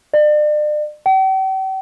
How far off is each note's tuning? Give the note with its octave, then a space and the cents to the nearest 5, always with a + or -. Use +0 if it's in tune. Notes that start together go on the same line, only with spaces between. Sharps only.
D5 +40
G5 -45